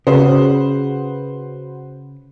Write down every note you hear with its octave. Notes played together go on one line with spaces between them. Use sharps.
C#3 F#4 B4 C5